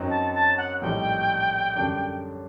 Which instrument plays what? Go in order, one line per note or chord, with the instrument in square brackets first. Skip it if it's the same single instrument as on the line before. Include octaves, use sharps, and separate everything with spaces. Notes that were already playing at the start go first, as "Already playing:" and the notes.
Already playing: [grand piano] F#2 F#3 C4 D#4
[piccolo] A5
A5
F#5
[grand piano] A#1 A2 G3 C4 D#4 [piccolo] G5
[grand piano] F#2 D3 G3 D4